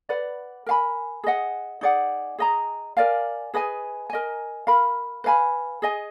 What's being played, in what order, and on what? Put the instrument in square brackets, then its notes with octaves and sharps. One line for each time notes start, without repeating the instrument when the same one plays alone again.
[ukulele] B4 D5 F#5
A#4 F5 G#5 B5
G#4 D#5 F#5
D#4 G#4 D5 F#5
G#4 D#5 A#5
A#4 D5 F5 G#5
G#4 B4 D#5 G#5
A#4 D#5 G#5
A#4 F5 B5
B4 F5 G#5 B5
G#4 D#5 G#5